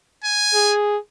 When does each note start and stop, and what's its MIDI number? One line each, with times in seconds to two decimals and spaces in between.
0.25 0.75 80
0.54 0.97 68